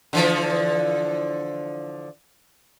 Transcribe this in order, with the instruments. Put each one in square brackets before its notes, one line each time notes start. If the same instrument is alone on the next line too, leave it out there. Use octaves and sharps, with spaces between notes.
[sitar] D3 E3 F3